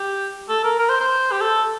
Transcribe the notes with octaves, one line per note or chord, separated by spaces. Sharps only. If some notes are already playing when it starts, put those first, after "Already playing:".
Already playing: G4
A4
A#4
A#4
C5
C5
G4
A4